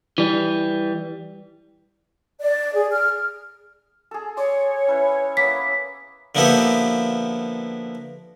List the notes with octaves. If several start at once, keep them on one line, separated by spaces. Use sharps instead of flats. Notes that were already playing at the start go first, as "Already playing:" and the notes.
E3 G3
D5
G#4
F6
G#4 A4
C#5 D5 C6
C#4 E4 B4
A#3 B3 E4 B6
D3 F3 A#3 B3 E4 G4